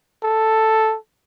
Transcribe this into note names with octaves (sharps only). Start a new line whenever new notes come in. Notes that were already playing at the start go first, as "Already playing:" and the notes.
A4